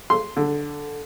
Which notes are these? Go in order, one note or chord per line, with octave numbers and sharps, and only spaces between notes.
C6
D3